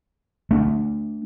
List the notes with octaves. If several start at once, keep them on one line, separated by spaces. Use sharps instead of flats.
A3 D4